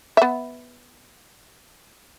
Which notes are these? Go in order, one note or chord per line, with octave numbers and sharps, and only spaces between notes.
B3 E5